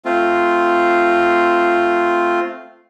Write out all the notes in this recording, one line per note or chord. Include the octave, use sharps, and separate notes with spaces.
A3 C4 F4